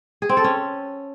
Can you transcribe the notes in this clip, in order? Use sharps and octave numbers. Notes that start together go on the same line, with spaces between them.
G#4
C4
A4
C#4